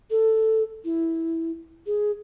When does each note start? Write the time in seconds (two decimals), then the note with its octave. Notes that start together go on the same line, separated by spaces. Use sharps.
0.11 A4
0.84 E4
1.86 G#4